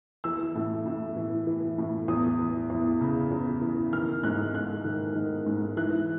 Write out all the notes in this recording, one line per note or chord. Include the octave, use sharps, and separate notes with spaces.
E3 E6
A2
A2
E3
E3
A2
E2 D#6
E3
E2
C#3
E2
E3
D#3 F6
G#2 F#6
G#2 F#6
D#3
D#3
G#2
E3 F#6